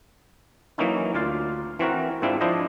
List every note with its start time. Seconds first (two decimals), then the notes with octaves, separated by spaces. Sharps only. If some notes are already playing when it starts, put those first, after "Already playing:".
0.78 E3 F#3 A#3 C#4 D#4 E4
1.14 D2 F4 D5 F5
1.79 E3 C4 F#4 A#4
2.22 G#2 C4 D4 E4 F4
2.41 F3 D4 E4 C5 D#5